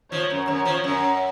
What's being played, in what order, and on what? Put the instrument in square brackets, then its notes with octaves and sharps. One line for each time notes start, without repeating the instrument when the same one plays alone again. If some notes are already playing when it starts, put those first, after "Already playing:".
[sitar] F3 [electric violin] C#5
[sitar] F#2
[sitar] F#2 [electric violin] C#5
[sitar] F3
F#2